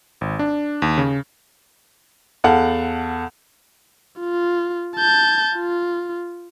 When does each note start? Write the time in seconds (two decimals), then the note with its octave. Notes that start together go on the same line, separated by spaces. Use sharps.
0.21 G#1
0.39 D4
0.82 D#2
0.98 C#3
2.44 E2 A4 F5 F#5
4.19 F4
4.96 A5 G6
5.56 F4